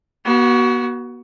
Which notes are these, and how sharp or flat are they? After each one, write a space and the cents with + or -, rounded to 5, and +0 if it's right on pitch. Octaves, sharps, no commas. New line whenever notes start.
B3 -40 F#4 +20